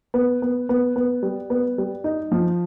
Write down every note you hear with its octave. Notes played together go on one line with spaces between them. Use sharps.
B3
B3
B3
B3
G3
B3
G3
D#4
F3